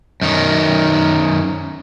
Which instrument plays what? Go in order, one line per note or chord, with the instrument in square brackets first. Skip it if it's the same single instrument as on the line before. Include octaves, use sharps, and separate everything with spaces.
[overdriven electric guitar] F#2 D#3